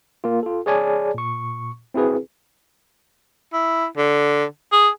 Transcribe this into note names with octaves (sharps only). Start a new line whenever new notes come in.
A#3 F4
F4 A4
G#4 C#5 D5 G#5 A5
A#2 C#6
C4 E4 F#4 G#4 B4
E4
D3
G#4